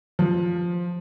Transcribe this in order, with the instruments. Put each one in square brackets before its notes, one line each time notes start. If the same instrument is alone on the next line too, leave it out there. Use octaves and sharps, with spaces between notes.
[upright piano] F3